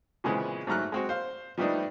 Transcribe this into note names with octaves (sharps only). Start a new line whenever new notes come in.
A#2 C#3 E3 G#3 B3 C4
G#2 F#3 A3 A#5 F6 F#6
G#3 C4 F#4
C5 F5
F3 G3 A3 B3 D4 D#4